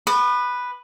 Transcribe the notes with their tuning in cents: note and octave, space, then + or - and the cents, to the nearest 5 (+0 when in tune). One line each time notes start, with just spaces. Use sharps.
B4 +0 D#6 -45